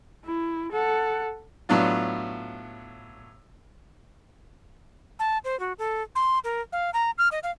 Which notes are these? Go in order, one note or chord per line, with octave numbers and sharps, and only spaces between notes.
E4
A4 F#5
A2 F#3 B3 D4 F4
A5
C5
F#4
A4
C6
A#4
F5
A#5
F6
D#5
F5